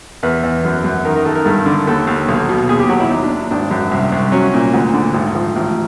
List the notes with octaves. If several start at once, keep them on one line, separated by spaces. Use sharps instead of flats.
E2 B4
E2
F#2
F#2
D#3 A#4
A#4
D#3 A4
A#4
G2 A4
D3
D#2 A4
D#2
B1
B2
D#2 G#4
G4
F#3 F#4
E4
D#2 D#4
D4
D#2
G#1 D4
F#2
C2
C2
F#3 C#4
A#2
D2
D3
G#1
F3
A1